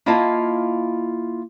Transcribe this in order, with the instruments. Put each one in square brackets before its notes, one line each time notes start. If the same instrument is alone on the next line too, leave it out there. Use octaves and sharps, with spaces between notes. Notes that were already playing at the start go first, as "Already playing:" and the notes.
[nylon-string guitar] A#3 E4 F4 D#5 F5 A5